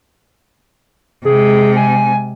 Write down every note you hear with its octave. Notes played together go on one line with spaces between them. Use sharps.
C3 G#3 G#4
G#5